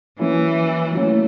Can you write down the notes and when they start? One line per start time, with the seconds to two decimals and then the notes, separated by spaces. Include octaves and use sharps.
0.19 E3 F#3 A#3 C#4 E4
0.95 F#3 A3 A#3 C#4 E4